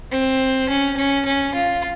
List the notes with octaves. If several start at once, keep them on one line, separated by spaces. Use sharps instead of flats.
C4
C#4
C#4
C#4
F4